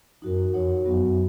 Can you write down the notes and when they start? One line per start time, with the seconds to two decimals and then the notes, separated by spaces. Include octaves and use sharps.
0.22 F#2 D#4 F#4 A#4
0.53 F2 D#4 F#4 C#5 F#5
0.85 F#2 F#3 B3 F#4